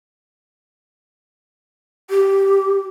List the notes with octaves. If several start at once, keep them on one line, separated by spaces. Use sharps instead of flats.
G4